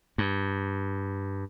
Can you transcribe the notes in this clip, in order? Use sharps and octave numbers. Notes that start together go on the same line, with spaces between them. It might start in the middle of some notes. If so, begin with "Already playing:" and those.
G2